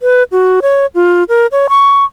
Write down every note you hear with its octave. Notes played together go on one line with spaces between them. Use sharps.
B4
F#4
C#5
F4
A#4
C#5
C#6